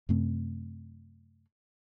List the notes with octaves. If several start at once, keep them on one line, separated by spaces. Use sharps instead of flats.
F#2 C3 A3 C4